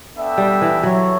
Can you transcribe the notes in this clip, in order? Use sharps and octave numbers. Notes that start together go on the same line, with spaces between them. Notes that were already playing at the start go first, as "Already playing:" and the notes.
B3 D4 A4 E5 G5
G3
E3
F#3 E4 A4 C#5